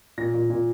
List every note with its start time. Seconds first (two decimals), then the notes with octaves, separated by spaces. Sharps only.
0.18 A#2 A#6
0.34 A#2
0.50 A#2